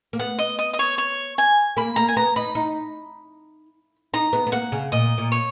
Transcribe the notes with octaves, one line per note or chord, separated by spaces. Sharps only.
A#3
B3 F#5
D#5
D#5
D#5
C#5
C#5
G#5
A#3 B5
A#3 A#5
G#5
B3 A#5
D#4 B5
D#4
D#4 A#5
B3
B3
A#3 F#5
C#3
A#2 D#5
A#2
C#5